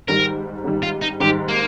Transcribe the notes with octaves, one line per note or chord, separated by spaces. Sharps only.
G#2 D#3 G3 A#4
G#2 D#3 G3
F4
D#4
G#2 D#3 G3 G4
A#3